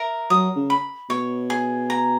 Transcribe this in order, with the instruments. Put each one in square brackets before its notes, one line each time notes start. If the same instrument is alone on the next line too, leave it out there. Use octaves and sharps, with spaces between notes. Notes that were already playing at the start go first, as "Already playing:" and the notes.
Already playing: [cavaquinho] A#4 E5
[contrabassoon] F#3 [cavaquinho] D#6
[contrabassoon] C#3
[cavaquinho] B5
[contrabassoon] B2 [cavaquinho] C#5
[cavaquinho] G#4
A#5